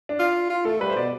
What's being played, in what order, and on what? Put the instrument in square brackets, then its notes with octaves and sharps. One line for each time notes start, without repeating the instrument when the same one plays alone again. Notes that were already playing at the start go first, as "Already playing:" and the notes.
[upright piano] D4
[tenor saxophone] F4
F4
[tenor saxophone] A3 [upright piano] A4
[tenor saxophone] G3 [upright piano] B4
[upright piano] C5
[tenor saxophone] B2 [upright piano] D5